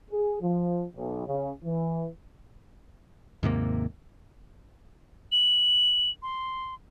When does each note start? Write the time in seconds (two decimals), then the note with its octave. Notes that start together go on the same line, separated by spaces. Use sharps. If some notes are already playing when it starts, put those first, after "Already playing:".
0.11 G#4
0.41 F3
0.96 B1
1.27 C#3
1.65 E3
3.43 D#2 G#2 C3 A#3
5.32 F#7
6.22 C6